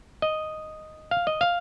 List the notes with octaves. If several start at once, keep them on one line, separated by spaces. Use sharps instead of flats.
D#5
F5
D#5
F5